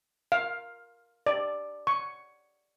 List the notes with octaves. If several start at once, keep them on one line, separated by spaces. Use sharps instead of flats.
F5
D5
C#6